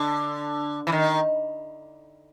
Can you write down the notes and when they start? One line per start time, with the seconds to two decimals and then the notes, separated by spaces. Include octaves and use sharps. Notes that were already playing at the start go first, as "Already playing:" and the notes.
Already playing: D3
0.87 E3
0.92 D#3